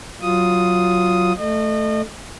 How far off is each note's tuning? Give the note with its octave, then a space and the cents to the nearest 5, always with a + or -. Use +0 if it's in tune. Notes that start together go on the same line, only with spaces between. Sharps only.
F#3 +0 F4 +0 D#6 +0
A3 +0 D#5 -35